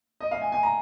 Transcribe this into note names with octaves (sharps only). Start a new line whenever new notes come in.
D#5
F5
G#5
G#5
A#5